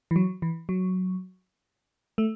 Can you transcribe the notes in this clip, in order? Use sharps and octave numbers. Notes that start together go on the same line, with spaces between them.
E3
F#3
E3
F#3
A3